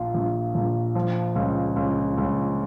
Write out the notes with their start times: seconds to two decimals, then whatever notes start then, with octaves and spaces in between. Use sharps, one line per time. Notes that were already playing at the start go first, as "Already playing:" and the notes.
Already playing: A#1 F4
0.14 A#1
0.55 A#1
0.95 F3
1.35 C#2
1.76 C#2
2.17 C#2